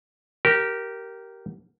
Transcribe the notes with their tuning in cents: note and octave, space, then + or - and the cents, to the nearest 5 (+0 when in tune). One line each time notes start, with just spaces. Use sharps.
G4 -20 A#4 +0